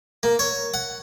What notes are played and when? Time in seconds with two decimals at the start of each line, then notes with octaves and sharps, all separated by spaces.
0.23 A#3
0.39 C#5
0.74 F#5